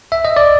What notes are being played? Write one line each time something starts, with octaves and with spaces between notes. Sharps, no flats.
E5
D#5
D5